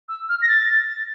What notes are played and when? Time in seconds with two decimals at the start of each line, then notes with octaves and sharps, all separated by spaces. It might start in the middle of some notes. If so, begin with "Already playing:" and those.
0.09 E6
0.29 F6
0.42 A#6
0.49 A6